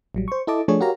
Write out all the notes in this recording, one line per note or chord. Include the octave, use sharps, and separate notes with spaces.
A1 F#3 G3
C5 C#6
E4 A4 D#5 A5 D6
F3 A3 D4 G#4 C#5
F#4 G4 A#4 C#5 F5 A#5